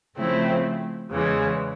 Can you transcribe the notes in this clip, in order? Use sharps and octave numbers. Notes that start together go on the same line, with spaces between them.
C#3 F3 A3 C4 E4
E2 C#3 E3 G#3